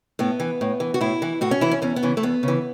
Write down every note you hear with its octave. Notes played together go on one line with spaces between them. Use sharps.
A2 B3
E3
A2
E3
F#4
A2 E4
E3
A2 F#4
C#4
E3 E4
C#4
E2 C#4
B3
C#3 E3
A3
E2 B3
C#3 E3